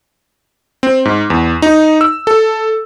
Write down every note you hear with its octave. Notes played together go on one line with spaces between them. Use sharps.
C4
G#2
E2
D#4
E6
A4